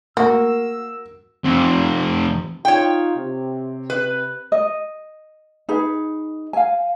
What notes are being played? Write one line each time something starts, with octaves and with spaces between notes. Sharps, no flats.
A#3 F#4 A#4 E6
F2 C3
D#4 F4 C#5 G5
C3
B4
D#5
D#4 G#4 B4
F5 G#5